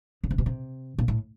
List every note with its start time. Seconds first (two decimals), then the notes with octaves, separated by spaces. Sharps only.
0.24 C#3
0.31 C3
0.38 B2
0.46 C3
0.98 A#2
1.08 A2